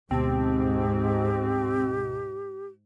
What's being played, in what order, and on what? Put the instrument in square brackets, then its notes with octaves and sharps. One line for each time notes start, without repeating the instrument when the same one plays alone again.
[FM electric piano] D2 B2 A5 [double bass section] G#2 [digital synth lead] C4 [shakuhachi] G4